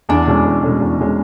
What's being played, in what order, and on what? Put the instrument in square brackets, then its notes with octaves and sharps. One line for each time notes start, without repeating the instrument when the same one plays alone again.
[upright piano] E2 [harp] D4
[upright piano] B2 G#3 C#4
E2
B2 G#3 C#4
E2
B2 G#3 C#4